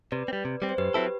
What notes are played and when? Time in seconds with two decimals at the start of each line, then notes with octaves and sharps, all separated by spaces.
0.12 C3 B4 D5
0.28 C4
0.33 G3
0.45 C3
0.62 G3 C4
0.69 C5
0.78 F#2 G4 B4
0.94 F#3 C4 E4 A4